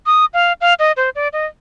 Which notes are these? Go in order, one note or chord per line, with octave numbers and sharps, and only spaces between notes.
D#6
F5
F5
D#5
C5
D5
D#5